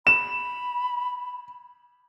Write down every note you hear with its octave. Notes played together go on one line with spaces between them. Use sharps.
B5 E7